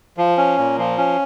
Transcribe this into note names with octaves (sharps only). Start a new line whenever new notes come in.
F3
C#4
A#2
F3
C#4